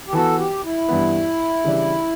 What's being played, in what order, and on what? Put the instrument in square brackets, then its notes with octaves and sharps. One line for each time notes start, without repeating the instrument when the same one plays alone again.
[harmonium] G4
[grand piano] E3 B3 F#4 [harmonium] A4
[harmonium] G4
E4
[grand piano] G2 E3 B3
C#3 E3 G3 D4